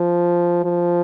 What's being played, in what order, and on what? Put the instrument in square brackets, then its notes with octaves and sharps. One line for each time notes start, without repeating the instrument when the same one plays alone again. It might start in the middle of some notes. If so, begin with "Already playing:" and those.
Already playing: [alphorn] F3
F3